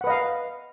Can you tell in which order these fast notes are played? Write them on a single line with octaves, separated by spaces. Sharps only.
F#5 B4 D#5 F5